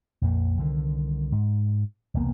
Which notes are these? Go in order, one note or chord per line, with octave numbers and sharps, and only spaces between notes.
A#1 F2 A#3
C2 D3 D#3
G#2
E1 C2 A#3 B3